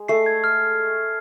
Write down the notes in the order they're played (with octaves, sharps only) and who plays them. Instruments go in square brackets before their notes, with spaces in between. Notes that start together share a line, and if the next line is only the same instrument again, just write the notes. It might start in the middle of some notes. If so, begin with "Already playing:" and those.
Already playing: [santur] G#3
[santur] A3 [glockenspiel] C7
[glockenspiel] G#6
F6